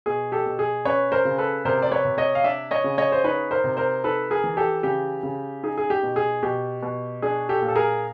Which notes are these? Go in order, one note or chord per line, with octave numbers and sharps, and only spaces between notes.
B2 G#4
G4 A4
B2
G#4
C#4 B4 C#5
A#4 C5
C#3
A4 B4
C3 A#4 C5
D5
B4 C#5
C3
C#5 D#5
F5
D4 D5 E5
C#5 D#5
C#3
C#5 D#5
C5
D#4 B4 C#5
A#4 C5
C3
A#4 C5
D#4 A4 B4
G#4 A#4
E3
G4 A4
C#3 G4
C#3
D#4 G#4
G#4
G4
B2
G#4
B2 G4
B2
D4 G#4
G4 A4
A#2
A4
G#4 A#4